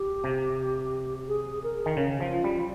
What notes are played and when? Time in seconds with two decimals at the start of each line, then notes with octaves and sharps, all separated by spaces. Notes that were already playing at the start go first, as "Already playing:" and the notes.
Already playing: G4
0.24 C3
1.28 G#4
1.63 A#4
1.86 D#3
1.97 C#3 C#4
2.21 F3
2.33 F4
2.44 G3